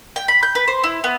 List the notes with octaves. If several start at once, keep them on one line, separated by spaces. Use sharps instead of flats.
G5
B5
G6
B4
C5
E4
B3